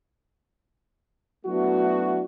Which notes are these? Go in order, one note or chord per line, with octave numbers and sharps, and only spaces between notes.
F#3 A3 B3 D4 E4 F#4